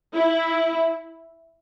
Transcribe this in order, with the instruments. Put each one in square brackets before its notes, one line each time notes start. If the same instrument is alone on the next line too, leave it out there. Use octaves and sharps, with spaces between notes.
[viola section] E4